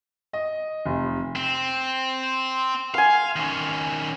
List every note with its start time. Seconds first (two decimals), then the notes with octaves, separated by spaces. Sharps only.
0.33 D#5
0.85 F1
1.36 C4
2.94 F5 G#5 C6
3.36 D#3 C#4